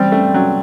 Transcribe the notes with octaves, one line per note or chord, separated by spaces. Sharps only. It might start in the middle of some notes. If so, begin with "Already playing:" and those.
Already playing: G3 C4
A3
F#3